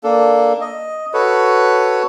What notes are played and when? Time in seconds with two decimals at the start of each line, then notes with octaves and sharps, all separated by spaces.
0.04 A#3 D4 A4
0.61 D#5
1.14 F#4 A4 B4 C#5